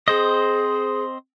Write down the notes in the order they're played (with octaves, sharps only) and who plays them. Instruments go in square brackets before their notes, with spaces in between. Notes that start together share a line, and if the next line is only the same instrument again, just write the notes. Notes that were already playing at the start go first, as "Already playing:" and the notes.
[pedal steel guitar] C4 C5 D#5 [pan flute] G#4